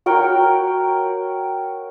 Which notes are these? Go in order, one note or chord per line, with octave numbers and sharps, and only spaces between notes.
F#4 A#4 C#5 G5